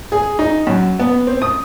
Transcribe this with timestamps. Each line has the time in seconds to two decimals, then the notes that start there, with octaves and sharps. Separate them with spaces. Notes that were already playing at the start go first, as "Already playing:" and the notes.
0.12 G#4
0.39 D#4
0.67 F#2
1.00 B3
1.27 C4
1.42 D#6